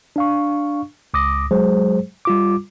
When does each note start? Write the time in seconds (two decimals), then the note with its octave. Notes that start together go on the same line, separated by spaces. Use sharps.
0.16 D4 F5 C#6
1.14 C#2 D6 D#6 A#6
1.51 F#3 G#3 G#4 C5
2.25 G3 F4 D6